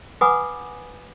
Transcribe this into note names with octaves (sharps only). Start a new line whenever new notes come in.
B4 F#5 G#5 B5 D6 D#6